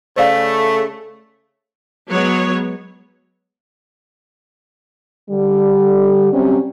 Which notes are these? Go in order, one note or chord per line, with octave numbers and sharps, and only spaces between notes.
C#3 A3 C5 D5 F5
F#3 G#3 B3 C#5
D3 G3
C3 F#3 G3 C4 C#4